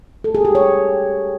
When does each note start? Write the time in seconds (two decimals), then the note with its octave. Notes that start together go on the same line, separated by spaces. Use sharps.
0.24 A4
0.35 G#4
0.45 G4
0.55 C#5